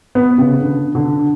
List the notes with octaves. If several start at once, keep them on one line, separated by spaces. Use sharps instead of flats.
B3
C#3
D3
D3